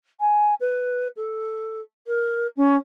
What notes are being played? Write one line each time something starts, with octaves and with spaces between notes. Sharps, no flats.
G#5
B4
A4
A#4
C#4